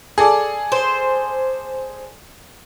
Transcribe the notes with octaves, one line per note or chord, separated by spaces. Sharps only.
G#4 A4 D5
C5